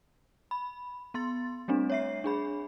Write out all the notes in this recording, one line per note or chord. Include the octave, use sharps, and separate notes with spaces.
B5
B3 C6 A6
G3 A3 C4 D4
C#5 E5 C7
D4 G#4 B5